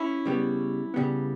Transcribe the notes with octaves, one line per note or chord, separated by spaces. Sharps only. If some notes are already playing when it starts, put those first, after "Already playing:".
Already playing: C#4 E4
C#3 G3 B3
C#3 G3 B3